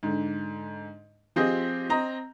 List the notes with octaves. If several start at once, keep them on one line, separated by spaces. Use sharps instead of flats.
G#2 D3
F3 C4 F4 G4 G#4 D#5
C4 D#5 A#5